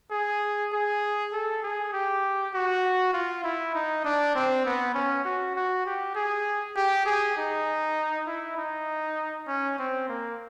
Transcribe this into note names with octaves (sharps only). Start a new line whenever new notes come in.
G#4
G#4
A4
G#4
G4
F#4
F4
E4
D#4
D4
C4
B3
C#4
F#4
F#4
G4
G#4
G4
G#4
D#4
E4
D#4
C#4
C4
A#3